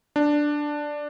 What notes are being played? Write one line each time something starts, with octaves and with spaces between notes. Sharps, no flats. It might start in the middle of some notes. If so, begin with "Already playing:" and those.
D4